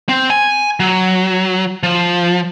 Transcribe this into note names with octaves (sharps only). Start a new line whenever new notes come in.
C4
G#5
F#3
F3